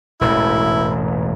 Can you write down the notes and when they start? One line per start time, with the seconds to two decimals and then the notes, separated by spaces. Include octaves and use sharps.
0.21 E1 A1 G#2 E4